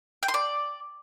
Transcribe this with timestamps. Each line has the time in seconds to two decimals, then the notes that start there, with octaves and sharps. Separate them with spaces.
0.23 G5
0.28 C6
0.34 D5